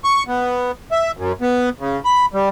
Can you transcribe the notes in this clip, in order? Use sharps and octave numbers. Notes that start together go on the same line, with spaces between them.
C#6
B3
E5
F#2
B3
C#3
B5
G3